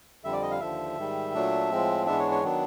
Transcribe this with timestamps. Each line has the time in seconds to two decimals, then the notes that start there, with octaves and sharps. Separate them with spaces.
0.24 F2 D3 G3 E5
0.32 D5
0.42 D#5
0.51 F5
0.60 D#2 D3 F3 E5
0.98 G#2 D#3 G3
1.34 A#2 F#3 A3 D4
1.71 A2 F3 G#3 C4
2.06 G#2 E3 G#3 B3 D4 E5
2.19 C#5
2.31 C#5
2.43 D#3 F#3 B3 D4